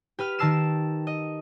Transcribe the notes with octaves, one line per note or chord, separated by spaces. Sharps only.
G4 B4 F6
D#3 A#4 A5 E6 C7 E7
D#5